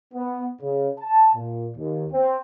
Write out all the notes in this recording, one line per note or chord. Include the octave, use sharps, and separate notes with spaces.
B3
C#3
A5
A#2
D#2
C4